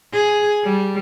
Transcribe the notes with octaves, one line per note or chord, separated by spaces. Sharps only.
G#4
G3